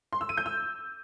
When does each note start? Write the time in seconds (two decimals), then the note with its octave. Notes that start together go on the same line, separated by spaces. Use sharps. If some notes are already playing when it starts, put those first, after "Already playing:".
0.13 C6
0.21 E6
0.29 D#7
0.37 G6
0.46 E6